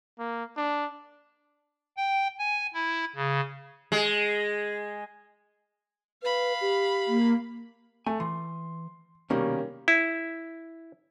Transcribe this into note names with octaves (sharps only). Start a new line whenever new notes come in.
A#3
D4
G5
G#5
E4
C#3
G#3
B4 F5 B5
G4
A#3
A3 G#5
E3 C6
C2 B2 D#3 G3 A#3 C#4
E4